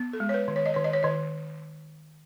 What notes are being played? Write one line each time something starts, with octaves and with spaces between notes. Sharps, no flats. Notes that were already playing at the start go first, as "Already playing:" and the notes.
Already playing: B3
A4
G#3
C#5
B4
D#3
C#5
D#5
D#3 C#5
D#5
C#5
D#3 D#5